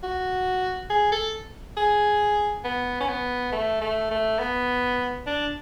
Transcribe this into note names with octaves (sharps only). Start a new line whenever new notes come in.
F#4
G#4
A4
G#4
B3
C#4
B3
A3
A3
A3
B3
D4